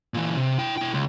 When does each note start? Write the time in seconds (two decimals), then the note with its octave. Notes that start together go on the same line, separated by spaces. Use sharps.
0.14 A#2 E3
0.37 C3
0.58 E4 G5
0.77 E4 G5
0.94 C#2